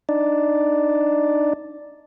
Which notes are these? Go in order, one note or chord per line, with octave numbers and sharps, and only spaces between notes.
D4 D#4 D5